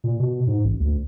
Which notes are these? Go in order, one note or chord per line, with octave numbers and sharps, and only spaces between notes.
A#2
B2
G#2
A1
D2